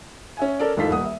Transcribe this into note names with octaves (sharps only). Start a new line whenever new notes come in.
C#4 E5 G#5
C#4 A4 A#4 D5
E1 A1 G#2 F4 A4 B6
D#1 F#5 D#6
E5